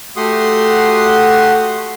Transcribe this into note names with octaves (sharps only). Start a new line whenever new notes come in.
A3 F#4 G4 F#5 C6 D#6